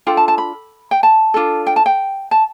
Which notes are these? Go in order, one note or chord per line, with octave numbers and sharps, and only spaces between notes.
D4 F4 A4 G5
A5
A5
B5
G5
A5
D4 F4 A4
G5
A5
G5
A5